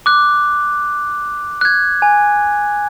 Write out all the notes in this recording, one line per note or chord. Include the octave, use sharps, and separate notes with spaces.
D6 F#6
F#6 G#6
G#5